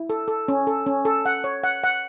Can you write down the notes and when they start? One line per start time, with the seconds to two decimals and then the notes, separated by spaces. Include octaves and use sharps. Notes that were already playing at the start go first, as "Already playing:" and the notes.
Already playing: E4
0.10 A4
0.28 A4
0.48 C#4
0.67 A4
0.86 C#4
1.05 A4
1.26 F#5
1.44 C#5
1.64 F#5
1.84 F#5